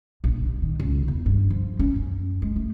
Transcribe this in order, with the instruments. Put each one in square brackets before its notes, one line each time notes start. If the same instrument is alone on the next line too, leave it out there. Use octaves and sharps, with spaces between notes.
[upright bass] A#1
D#1
D#3
C#2
E2
G2
F3
C#4
F#2
G#3
A3